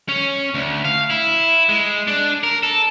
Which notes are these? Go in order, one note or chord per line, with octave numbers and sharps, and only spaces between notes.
C#4
D2
F5
E4
G#3
D4
A#4
A4